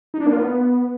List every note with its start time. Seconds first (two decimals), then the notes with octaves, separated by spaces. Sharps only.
0.14 D#4
0.20 D4
0.26 A#3
0.33 F4
0.39 B3